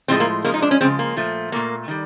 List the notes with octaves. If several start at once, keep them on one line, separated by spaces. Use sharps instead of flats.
A2 F3 G#3 C4
A#3
C#3 F3 G#3 A#3
D#4
D4
C#4
C#3 F3 G#3 C4
A#3
A#2 F3 A3
A#2 F3 A3 A#3
D#3 G3